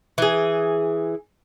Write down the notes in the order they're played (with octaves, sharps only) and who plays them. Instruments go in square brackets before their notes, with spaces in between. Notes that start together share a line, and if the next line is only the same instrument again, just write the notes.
[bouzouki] E3 G#4